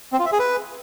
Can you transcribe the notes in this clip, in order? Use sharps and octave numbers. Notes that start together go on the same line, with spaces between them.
C4
F4
E5
G#4
B4